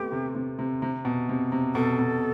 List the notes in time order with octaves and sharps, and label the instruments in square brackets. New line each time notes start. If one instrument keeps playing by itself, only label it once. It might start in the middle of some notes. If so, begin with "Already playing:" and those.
Already playing: [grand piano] A3 B3 C4 [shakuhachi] G4
[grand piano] C3
C3
C3
C3
B2
C3
C3
[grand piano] B2 [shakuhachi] A4
[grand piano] B2